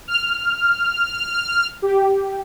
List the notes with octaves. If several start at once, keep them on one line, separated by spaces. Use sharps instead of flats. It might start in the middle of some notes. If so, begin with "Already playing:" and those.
F6
G4